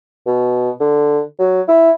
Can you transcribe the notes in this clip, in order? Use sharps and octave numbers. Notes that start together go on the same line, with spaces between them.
B2
D3
F#3
E4